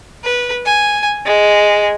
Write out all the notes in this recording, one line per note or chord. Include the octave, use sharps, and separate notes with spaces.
B4
G#5
G#3